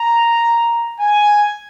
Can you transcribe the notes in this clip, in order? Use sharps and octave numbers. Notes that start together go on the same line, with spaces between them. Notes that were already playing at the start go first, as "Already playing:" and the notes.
Already playing: A#5
G#5